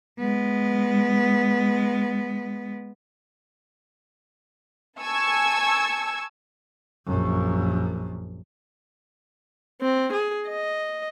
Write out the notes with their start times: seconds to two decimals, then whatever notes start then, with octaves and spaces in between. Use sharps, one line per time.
0.19 G#3 B3
5.01 G#5 A5 C#6 E6 G#6
7.07 A#1 F#2
9.81 C4
10.13 G#4
10.49 D#5